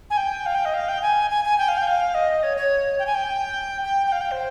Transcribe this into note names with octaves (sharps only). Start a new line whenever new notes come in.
G#5
G5
F5
G5
D#5
F5
G5
G#5
G#5
G#5
G5
F5
G5
F5
D#5
C#5
C#5
G5
G#5
G5
G5
G5
F5
G5
C5